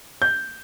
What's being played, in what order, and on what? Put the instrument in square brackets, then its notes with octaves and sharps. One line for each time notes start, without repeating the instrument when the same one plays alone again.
[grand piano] G6